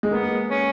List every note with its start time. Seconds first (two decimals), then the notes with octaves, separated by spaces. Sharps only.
0.03 G#3
0.11 A#3 B3
0.50 C#4